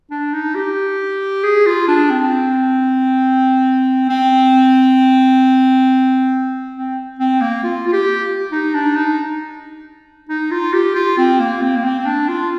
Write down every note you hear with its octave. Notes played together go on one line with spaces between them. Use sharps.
D4
D#4
G4
G#4
F4
D4
C4
C4
C4
C4
A#3
F4
F4
G4
D#4
D4
D#4
D#4
F4
G4
F4
C4
A#3
C4
A#3
C4
C4
D4
F4